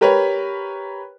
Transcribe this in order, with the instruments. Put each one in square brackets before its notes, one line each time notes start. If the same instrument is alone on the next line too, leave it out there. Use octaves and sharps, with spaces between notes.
[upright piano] G4 A#4 B4 C#5